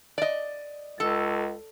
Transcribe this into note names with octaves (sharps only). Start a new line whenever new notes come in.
D5 D#5
C#2 A4